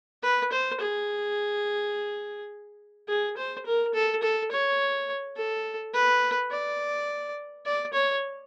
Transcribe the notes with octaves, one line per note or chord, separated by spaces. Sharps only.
B4
C5
G#4
G#4
C5
A#4
A4
A4
C#5
A4
B4
D5
D5
C#5